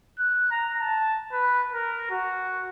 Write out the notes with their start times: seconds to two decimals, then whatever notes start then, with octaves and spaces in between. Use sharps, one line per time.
0.19 F#6
0.51 A#5
0.80 A5
1.33 B4
1.72 A#4
2.10 F#4